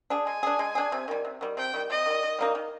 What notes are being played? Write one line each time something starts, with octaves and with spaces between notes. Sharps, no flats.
D4 G#4
G#3 G#5
D4 G#4
G#3
D4 G#4
C3
D#3 G3
C3
D#3 G3
C3 G5
D#3 G3
C3 D#5
D#3 G3
D#3
G3 A#3 D#4
D#3